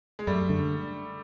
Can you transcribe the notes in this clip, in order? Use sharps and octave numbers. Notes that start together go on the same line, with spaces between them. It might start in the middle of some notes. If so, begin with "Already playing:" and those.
G#3
F#2 G3 A3
D3